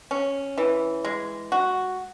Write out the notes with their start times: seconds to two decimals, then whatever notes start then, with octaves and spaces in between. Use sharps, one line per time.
0.11 C#4
0.58 E3
1.04 G#3
1.52 F#4